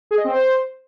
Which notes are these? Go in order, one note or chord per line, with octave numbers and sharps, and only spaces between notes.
G#4
D#5
C4
C5